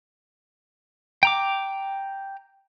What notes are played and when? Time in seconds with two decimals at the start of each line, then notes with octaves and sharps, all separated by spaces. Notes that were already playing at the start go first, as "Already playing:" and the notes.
1.23 G5 A#5 D6